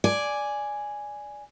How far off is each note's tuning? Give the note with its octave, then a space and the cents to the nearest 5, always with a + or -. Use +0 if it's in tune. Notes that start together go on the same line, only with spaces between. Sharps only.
D5 +0 G#5 +0